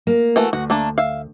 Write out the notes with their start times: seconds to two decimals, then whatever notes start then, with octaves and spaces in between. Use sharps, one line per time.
0.07 A#3
0.36 E3 A3 F#4
0.53 D2 F#4
0.70 A3 A#3 D4
0.98 E5 F5